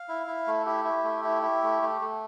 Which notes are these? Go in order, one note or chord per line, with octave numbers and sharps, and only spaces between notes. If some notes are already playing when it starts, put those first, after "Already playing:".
Already playing: F5
E4
E4
A3
E4 G4
E4
A3
E4
E4
A3
A3
A3